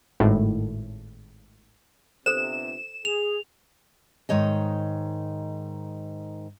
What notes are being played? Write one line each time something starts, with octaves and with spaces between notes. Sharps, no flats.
G#1 A2
G1 C3 A4 C5 E7
G#4 F7
G#2 D#3 C#5 D#5